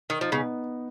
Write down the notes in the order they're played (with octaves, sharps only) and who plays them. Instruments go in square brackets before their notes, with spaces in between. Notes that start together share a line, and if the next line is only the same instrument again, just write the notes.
[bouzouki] D#3 [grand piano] D#4
[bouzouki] F3
[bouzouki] C#3 [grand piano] B3